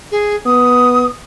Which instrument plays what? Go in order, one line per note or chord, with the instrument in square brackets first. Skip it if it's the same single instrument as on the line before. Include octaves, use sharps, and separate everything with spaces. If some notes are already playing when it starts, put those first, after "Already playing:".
[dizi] G#4
[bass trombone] B3 [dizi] D#6